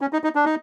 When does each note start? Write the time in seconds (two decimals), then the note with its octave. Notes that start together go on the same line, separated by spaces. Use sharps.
0.01 C#4
0.13 D#4
0.24 D#4
0.35 D4
0.45 D#4